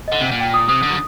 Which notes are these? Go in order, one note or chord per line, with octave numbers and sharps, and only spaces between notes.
D#5
D3 F#5
C3
A#2
G5
D#6
C3 D#6
D3
F#3